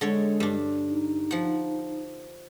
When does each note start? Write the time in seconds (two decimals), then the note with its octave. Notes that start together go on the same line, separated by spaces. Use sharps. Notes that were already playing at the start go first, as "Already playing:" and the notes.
0.01 D3 G#3 A4 C#5
0.40 G2 D4
0.90 D#4
1.31 F3 F#5